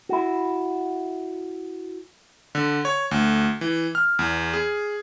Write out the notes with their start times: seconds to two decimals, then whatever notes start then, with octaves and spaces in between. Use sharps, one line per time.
0.09 E4 F#4
2.55 D3
2.85 C#5
3.11 D2
3.61 E3
3.95 F6
4.19 E2
4.53 G#4